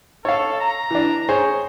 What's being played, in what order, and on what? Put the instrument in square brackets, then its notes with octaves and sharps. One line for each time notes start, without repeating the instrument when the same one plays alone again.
[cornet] A4 [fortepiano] C#5 F5
[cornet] A#5
[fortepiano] E3 D4
G#4 C5 C#5